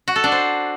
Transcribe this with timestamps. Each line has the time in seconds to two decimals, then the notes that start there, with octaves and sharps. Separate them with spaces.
0.08 F#4
0.16 A4
0.24 D4
0.32 C5